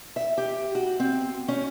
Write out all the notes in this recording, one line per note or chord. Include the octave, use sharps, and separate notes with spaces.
E5
G4
F#4
C4
C#4